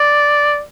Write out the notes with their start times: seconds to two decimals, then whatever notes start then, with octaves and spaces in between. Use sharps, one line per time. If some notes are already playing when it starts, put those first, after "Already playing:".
Already playing: D5